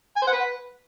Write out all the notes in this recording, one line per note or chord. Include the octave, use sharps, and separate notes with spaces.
G#5
C5
F#5
B4